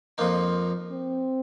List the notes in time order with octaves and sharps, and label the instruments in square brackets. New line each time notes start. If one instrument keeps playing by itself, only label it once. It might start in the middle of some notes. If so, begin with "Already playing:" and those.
[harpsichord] F2 F3 A#3 D#4
[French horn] C4